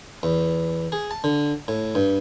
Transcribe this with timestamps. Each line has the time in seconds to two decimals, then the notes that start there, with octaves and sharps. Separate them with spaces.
0.23 E2
0.92 G#4
1.11 A5
1.24 D3
1.68 A2
1.95 G2